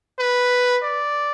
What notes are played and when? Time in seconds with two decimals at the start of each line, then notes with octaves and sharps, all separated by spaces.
0.19 B4
0.83 D5